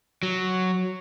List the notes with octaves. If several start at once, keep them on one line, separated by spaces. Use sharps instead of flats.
F#3